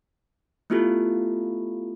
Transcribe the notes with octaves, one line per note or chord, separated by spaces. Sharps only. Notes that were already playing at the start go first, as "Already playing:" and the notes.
A3 B3 E4 F4 G4 A4